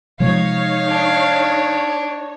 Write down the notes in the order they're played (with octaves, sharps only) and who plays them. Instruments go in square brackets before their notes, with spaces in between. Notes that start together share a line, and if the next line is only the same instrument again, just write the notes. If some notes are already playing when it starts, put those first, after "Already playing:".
[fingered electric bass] C3 F3 G#3 [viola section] D#4 C#5 [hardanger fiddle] F5
[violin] D4